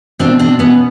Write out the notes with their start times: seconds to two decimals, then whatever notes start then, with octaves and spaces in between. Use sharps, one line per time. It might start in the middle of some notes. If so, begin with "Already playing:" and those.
0.19 B2 C4 D4
0.39 C4 D4
0.59 B2 B3 C#4